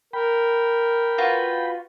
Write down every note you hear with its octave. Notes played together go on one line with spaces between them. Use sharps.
A#4 G5 B5
F4 F#4 B4